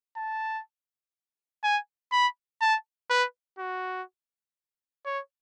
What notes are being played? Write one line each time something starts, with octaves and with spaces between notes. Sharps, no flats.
A5
G#5
B5
A5
B4
F#4
C#5